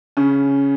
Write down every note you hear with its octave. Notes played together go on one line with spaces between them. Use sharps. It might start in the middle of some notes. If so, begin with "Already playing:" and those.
C#3 C#4